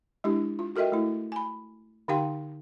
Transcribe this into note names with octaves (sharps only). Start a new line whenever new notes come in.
G#3 D4 E4 G4
F4
F#4 A4 A#4 D#5 E5 G5
A3 E4
G#5 B5
D3 D#4 G4 F5 G5 C6